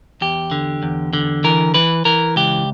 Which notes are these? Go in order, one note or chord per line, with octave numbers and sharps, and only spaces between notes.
E2 G4
D3
E2
D3
E3 A#4
E3 B4
E3 A#4
C#2 G4